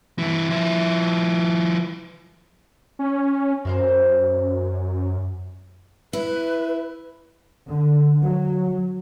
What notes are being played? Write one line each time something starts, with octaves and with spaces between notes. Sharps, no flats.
G2 E3
F3 E4
C#4
F#2 C4 A#4 C5
E4 B4
D3
F#3